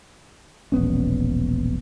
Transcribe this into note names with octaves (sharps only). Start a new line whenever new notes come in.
E1 A#1 B3 C#4